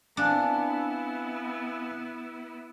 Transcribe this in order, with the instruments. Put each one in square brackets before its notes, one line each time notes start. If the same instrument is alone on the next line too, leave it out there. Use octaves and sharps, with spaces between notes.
[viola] B3 E4 [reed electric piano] C4 F5 G#5 [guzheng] D4